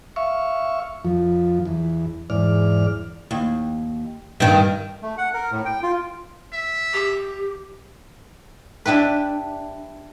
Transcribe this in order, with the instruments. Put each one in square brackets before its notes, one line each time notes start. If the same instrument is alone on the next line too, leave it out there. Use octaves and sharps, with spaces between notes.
[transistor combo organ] E5 F5 C#6
F2 F3
E2
E2 G#2 D5 F6
[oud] D#2
G2 D#3
[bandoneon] A3
F#5
A#4
A2
G5
F4
[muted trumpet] E5
[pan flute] G4
[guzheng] D4 E4 G4 B4